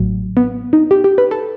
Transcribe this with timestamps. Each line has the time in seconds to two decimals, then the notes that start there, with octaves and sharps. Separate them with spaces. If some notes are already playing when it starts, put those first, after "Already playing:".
Already playing: A1 A2 F#3
0.37 B3
0.73 D#4
0.91 G4
1.04 G4
1.18 B4
1.31 A4